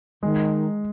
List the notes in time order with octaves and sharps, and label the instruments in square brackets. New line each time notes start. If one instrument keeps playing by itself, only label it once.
[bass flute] D#3 [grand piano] G#3